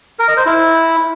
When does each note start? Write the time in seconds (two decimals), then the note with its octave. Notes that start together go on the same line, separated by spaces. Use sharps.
0.19 A#4
0.28 D#5
0.37 C5
0.46 E4